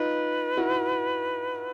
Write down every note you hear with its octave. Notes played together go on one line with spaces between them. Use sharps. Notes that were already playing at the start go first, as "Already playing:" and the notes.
Already playing: D#4 F4 B4
E4 F#4